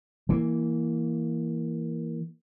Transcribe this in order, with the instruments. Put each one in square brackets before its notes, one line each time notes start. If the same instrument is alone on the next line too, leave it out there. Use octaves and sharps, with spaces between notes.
[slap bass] E3 A#3